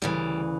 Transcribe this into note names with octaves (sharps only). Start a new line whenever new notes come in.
D2 C#3 E3 G3